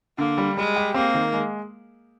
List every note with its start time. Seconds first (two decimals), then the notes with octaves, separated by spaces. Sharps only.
0.18 D3 A#3
0.38 G3
0.56 G3 G#3
0.76 G4
0.94 A#3 C4
1.14 D#3
1.33 G#3